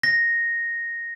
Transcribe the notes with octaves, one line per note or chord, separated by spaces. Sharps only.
A#6